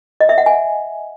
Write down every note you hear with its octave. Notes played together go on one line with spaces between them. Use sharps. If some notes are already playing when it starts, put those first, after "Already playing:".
D#5
E5
F#5
G#5